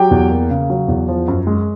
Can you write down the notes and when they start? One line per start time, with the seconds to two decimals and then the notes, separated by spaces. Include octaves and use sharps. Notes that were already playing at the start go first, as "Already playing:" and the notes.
Already playing: F#3 G4 G5
0.11 E2
0.30 A#3
0.50 C#3
0.70 F#3
0.88 E2
1.08 F3
1.28 F#2
1.47 G#3